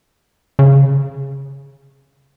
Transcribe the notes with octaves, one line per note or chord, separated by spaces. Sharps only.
C#3